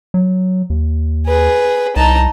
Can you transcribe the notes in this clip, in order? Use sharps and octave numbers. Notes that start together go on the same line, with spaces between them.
F#3
D#2
G#4 B4
C2 D#4 A5